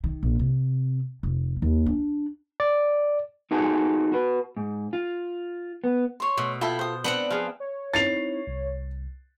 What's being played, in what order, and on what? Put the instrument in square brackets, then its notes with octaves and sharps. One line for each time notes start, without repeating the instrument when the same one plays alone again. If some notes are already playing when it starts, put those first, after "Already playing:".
[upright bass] D#3
A#1
C3
F1
D#2
D4
[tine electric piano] D5
[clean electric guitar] D#4 F4 F#4 G#4 A4
F#4 B4
G#2
F4
B3
[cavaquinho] C#5 C6
[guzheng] B2 [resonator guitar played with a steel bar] A3
[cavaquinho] E4 G5 B5 [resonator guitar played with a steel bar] F4 A4
[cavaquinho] C5 D#6
[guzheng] B3 C4 F#5 [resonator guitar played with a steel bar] D4
[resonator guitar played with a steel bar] F3 [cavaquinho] G#4 F5
[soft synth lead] C#5
[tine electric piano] C4 D#4 E4 [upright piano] A6 C7 F7
[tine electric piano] C2